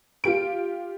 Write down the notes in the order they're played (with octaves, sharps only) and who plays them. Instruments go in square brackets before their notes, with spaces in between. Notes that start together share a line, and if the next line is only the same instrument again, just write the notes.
[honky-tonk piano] F4 G4 D7